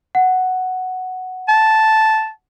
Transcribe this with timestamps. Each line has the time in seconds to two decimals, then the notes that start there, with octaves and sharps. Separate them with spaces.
0.15 F#5
1.48 A5